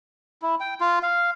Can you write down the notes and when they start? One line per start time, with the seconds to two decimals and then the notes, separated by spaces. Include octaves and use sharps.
0.42 E4
0.60 G5
0.80 F4
1.03 F5